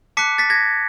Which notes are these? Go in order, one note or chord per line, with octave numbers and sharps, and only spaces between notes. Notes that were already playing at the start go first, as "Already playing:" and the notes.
A5 D6 F#6 B6 C#7
A6 B6
G#6 A#6